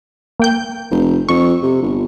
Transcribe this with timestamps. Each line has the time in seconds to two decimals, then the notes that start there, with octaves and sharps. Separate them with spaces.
0.40 A#3 G5 G6
0.91 F1
1.29 F2 C#6
1.63 C3
1.82 G1